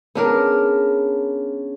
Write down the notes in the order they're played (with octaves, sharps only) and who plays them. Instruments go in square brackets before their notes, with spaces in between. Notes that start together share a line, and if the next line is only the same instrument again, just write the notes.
[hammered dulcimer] C#3 [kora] B3 D4 A#4